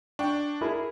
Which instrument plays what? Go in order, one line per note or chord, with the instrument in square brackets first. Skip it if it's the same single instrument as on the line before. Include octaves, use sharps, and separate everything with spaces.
[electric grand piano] D4 [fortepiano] G5 C#6
[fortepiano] E4 G#4 A#4